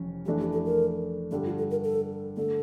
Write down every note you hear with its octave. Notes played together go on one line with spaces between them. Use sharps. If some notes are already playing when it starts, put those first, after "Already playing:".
Already playing: F1 F2 E3 C#4
F2 E3 A3 D4 G4
G4
A4
A#4
G2 D3 G3 A4
F4
A4
A#4
A4
D3 A3 A4